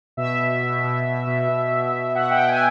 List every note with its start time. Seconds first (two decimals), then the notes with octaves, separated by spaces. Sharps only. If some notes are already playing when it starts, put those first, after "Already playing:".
0.17 B2 E5
0.39 B2
0.62 B2
0.84 B2
1.05 B2
1.27 B2
1.49 B2
1.71 B2
1.93 B2
2.15 B2 F#5
2.31 G5
2.36 B2
2.48 G#5